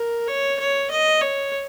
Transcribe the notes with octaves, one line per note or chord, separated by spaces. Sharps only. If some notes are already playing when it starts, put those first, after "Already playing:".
Already playing: A#4
C#5
C#5
D#5
C#5